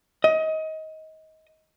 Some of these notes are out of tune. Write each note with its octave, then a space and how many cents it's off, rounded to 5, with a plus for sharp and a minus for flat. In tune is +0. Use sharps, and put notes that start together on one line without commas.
D#5 +25